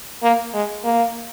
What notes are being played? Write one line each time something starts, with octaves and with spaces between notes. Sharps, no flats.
A#3
G#3
A#3